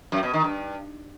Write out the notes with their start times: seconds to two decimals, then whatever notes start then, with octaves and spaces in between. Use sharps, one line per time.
0.12 F#2
0.23 B2
0.34 D#3
0.44 G2